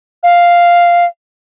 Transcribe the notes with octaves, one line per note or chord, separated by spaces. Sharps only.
F5